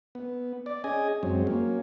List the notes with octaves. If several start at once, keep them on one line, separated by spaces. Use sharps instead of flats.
B3
D5
C#4 G#4 D#5 G#5
F#2 F#3 G#3 C4
F#3 A#3 C#4